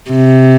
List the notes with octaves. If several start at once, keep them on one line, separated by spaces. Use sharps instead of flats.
C3